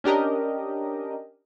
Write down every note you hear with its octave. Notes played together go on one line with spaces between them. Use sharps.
C#4 D4 G4 A#4 D#5